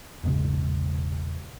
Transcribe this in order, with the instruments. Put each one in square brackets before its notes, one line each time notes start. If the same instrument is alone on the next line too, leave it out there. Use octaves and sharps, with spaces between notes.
[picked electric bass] E1 A#1 G#2 C#3